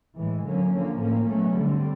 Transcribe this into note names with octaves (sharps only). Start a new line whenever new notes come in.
A2 E3 G#3
D3 F#3 A#3 C#4
D3 F3 A#3
A2 F3 A#3 C#4
B2 F#3 A3 C#4
D3 G3 C4